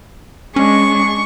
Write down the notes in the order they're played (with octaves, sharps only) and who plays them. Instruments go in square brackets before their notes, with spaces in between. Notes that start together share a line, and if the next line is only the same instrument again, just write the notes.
[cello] G#3 D4 [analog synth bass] C#4 [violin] C#6